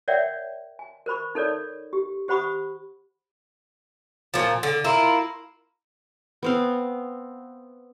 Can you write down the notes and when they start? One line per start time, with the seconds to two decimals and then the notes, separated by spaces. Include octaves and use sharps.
0.08 A#4 C#5 D5 E5 F#5 G5
0.79 G#5
1.06 A#4 C5 B5 C#6
1.35 D#4 A4 A#4 C#5 D5
1.93 G4
2.28 G4 C5 F#5 B5 C#6 D#6
4.34 A#2 F3
4.63 D3
4.84 A#3 E4 F4
6.43 B3 C4 F5